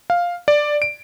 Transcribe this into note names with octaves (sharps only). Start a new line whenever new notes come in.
F5
D5
D7